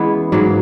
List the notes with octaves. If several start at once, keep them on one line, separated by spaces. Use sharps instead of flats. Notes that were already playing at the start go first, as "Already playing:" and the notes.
Already playing: E3 G#3 B3 C#4
G#2 F#3 A#3